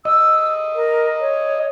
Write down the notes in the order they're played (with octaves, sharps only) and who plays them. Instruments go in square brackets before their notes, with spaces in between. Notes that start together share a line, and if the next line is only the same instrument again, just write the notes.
[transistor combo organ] D#5 [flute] E6
[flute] A#4
C#5